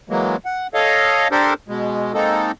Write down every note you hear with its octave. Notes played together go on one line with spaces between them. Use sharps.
E3 F#3 G#3 A#3
F#5
A4 C#5 D#5 F5
D4 G4 A4 A#4 C5
B2 G#3
G#3 A#3 C4 D#4 A4